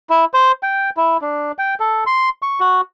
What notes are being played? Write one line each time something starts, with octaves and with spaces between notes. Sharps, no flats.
E4
C5
G5
E4
D4
G5
A4
C6
C#6
F#4